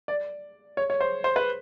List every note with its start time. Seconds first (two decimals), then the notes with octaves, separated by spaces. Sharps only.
0.08 D5
0.77 C#5
0.90 C#5
1.00 C5
1.24 C5
1.36 B4